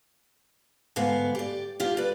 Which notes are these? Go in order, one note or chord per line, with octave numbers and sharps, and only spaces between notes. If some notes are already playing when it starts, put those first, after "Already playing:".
D2 G#2 B3 F5
G4 D5
F4 G4 D5
B4 D5